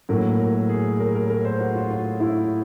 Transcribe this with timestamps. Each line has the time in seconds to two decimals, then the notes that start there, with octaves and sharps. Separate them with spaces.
0.09 A2 F#3 A#3 A#4
0.40 A#4
0.69 G#4
1.00 A#4
1.15 A#4
1.30 A#4
1.45 C5
1.60 F#4
1.75 F4
1.90 F4
2.20 E4